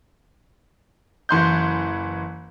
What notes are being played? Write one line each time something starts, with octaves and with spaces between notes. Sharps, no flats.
F#1 E3 C6 G6